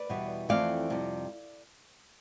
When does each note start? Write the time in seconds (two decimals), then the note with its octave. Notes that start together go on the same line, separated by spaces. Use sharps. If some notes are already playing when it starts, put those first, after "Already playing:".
Already playing: B4 D5
0.09 E2 B2 G3 B3
0.49 F2 E3 A3 C4 D5 F5
0.90 F2 C3 G3